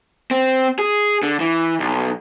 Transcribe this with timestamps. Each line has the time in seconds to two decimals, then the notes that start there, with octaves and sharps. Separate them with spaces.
0.31 C4
0.79 G#4
1.23 D3
1.40 E3
1.80 B1